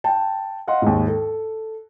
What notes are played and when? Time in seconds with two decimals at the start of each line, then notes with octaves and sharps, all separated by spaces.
0.04 G5 A5
0.67 D#5 F5 F#5 C6
0.82 D#2 G#2
1.08 A4